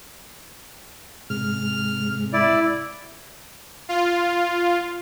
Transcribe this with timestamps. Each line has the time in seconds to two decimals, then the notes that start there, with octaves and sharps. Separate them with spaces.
1.30 G#2 C3 G#3 F6
2.33 E4 D5
3.89 F4